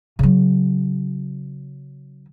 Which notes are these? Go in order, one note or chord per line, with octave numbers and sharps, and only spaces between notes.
C#3 F#3